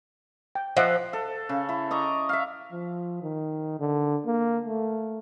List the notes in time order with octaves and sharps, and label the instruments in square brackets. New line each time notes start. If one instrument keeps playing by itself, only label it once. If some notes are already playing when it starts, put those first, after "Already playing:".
[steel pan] G5
[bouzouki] F3 [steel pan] D#5 E5 F#5
[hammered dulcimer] A4
C#3
E4
D5 D#5 A#5 C#6
E5 F5
[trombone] F3
D#3
D3
A#3
A3